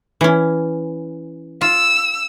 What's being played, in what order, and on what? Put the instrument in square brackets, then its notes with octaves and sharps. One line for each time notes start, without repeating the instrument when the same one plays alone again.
[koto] E3 C#4
[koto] F4 [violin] E6